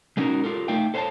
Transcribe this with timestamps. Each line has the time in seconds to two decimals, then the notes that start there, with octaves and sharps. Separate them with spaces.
0.17 G#3 A3 C#4 D#4 F#4 A#4
0.44 F4 G4 A4 A#4
0.68 A3 D#4 E5 F5 G5
0.94 A4 C5 C#5 E5 F5 A5